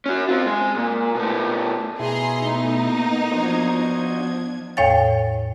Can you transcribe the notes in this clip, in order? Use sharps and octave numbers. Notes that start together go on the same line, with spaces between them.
C#4 F#4
C4 F4
G#3
A#2
B2 A3
B2 E4 G#4 A#5 C6
A3 B3 D#4
A#3 D#5
F3 D4 F#4 C5 D#5 G#6
E2 A2 C#5 F5 G5 A6